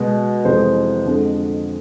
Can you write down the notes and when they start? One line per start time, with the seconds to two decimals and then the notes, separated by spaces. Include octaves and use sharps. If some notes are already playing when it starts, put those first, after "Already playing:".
Already playing: B2 G#3
0.45 F2 C3 E3 G#3 C5
1.05 F2 D3 G#3